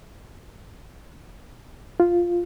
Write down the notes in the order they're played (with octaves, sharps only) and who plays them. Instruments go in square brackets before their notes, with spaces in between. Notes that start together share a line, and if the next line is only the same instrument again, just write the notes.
[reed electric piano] F4